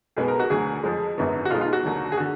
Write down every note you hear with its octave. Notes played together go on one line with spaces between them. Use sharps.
B1 B2 G#3 B3 G#4
A#4
F#4
D2 D3 F#3 G#4
F2 F3 G#3
G#1 F#2 D3 F#3 B3
F#4
B1 B2 G#3 D#4 F4
F4
F#4
D#2 D3 F#3
G#4
D3 F#4